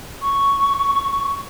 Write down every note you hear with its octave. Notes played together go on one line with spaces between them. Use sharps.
C#6